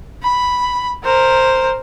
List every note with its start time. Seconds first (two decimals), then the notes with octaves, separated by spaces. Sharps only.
0.23 B5
1.04 A#4 C5